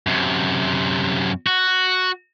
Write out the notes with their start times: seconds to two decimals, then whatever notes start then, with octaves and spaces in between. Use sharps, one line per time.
0.07 F#2 C3
1.47 F#4